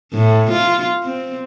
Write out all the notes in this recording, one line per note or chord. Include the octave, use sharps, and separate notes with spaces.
A2
F4
C4